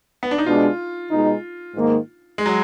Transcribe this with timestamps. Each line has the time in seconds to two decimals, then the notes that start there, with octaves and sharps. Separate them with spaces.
0.23 B3
0.31 D4
0.38 D#4
0.46 B2 G#3 D4 F4
1.10 B2 G#3 D#4
1.75 G#2 D#3 A#3 D#4
2.38 G#3
2.46 F#3